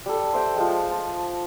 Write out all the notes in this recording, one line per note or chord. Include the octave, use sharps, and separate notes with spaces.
G3 A4
C5 E5 G5
F3 G#3
A5